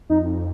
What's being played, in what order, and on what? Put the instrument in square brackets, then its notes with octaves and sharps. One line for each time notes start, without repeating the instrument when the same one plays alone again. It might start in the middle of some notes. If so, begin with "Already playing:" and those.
[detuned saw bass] F2 [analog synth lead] D#4